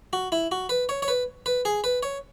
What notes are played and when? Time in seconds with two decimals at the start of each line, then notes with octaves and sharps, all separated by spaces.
0.13 F#4
0.32 E4
0.52 F#4
0.69 B4
0.89 C#5
1.02 C#5
1.08 B4
1.46 B4
1.65 G#4
1.84 B4
2.03 C#5